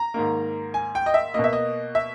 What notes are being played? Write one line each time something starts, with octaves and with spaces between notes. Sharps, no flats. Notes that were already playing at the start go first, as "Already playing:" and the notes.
Already playing: A#5
G#2 D#3 A#3
G#5
G5
D#5
E5
B2 A#3 D#5
E5
D#5
E5